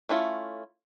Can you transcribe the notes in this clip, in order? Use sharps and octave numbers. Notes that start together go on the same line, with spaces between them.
A3 C#4 E4 F4